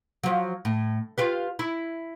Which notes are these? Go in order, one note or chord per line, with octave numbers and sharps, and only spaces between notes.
F3 F#3
A2
F4 G4 B4
E4